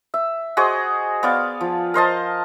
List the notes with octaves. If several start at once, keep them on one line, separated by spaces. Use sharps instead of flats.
E5
F#4 G#4 C5 D#5
B3 D5 F5
F3
A#4 C5 D#5 A5